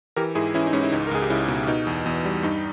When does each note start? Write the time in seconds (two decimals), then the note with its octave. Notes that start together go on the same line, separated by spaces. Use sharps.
0.16 E3 G4 A#4
0.35 G#2 E4 G#4
0.54 E3 C#4 E4
0.66 D#4
0.73 G#2 C#4
0.83 E4
0.92 C#2 D#4
1.07 A#4
1.11 C#2 G#4
1.22 G4
1.29 C#2 C#4 E4
1.48 B2
1.67 B2 D#4
1.87 E2
2.06 E2
2.25 G3
2.43 G2 D#4